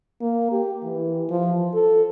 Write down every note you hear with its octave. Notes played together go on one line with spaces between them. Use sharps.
A#3
G4
E3
F3
A4